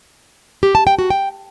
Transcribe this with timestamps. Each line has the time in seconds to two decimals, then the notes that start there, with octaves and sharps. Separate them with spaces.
0.63 G4
0.75 A5
0.87 G5
0.99 F#4
1.10 G5